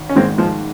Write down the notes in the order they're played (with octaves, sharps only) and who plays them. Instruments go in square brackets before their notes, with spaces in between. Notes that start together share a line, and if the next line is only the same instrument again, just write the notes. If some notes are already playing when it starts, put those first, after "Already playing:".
Already playing: [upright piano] G#1
[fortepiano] C#4
[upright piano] G#2 D#3 [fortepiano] G#3 C4
[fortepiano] F3 G#3